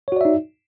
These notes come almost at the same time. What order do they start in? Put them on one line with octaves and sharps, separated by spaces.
C#5 F#4 D5 E5 D#4